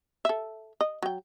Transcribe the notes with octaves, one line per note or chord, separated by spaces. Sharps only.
A4 E5
D#5
F#3 G5